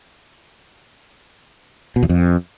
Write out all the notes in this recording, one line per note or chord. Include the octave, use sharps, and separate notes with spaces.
B2
E2
F2